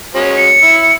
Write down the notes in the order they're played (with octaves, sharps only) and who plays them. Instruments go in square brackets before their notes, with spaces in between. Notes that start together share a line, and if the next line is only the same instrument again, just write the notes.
[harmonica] F#3 G#3 C#4
[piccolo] C#7
[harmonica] E4 E5